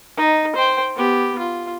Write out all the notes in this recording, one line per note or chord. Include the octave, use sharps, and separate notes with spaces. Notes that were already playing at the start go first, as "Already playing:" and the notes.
D#4
C5 G5
B3 G4
F4